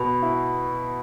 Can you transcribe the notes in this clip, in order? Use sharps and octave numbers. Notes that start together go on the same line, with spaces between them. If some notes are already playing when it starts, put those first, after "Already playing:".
Already playing: B2 B5
E4